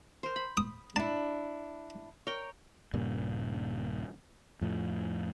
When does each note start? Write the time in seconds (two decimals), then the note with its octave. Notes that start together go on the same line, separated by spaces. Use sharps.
0.23 A#4 C5
0.36 B5
0.57 D#6
0.96 D4 E4 A5
2.27 A#4 C#5 G5
2.93 D#1 G2 A#2 C#3
4.61 F2 A2 F3